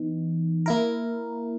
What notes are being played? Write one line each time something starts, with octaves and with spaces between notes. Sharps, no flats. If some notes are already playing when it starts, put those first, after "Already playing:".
Already playing: E3 B3 D#4
A#3 E4 A#4